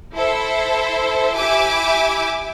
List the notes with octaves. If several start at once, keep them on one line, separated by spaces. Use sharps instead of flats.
E4 A4 C5 E5
E4 G4 E5 G#5 D6